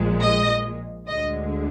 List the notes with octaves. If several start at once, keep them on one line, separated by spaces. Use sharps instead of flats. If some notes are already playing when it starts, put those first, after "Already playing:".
Already playing: A#1 A#2 F3 G#3
D#5
D2 D3 G#3 D#5